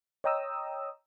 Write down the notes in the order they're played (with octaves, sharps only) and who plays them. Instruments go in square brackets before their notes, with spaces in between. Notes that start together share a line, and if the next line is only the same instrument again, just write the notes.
[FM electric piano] C#5 D#5 G5 A#5 D#6 E6